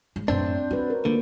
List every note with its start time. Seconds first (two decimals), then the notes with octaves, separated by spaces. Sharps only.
0.16 G#2
0.28 F#2 A2 C4 D4 C5
0.71 C#4 F#4 B4
0.90 A#4
1.05 D3 A#3 F4